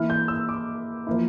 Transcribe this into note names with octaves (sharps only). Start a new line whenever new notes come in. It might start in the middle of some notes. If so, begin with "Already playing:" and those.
Already playing: E3 A#3 E4 F6
G6
E6
D6
F3 A#3 E4